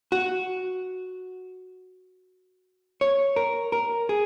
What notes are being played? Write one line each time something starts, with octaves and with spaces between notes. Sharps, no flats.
F#4
C#5
A#4
A#4
G#4